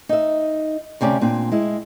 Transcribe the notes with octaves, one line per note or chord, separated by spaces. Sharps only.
D#4 E5
D2 C3 C#4 D5
A#2 C4 D4
G#3 E4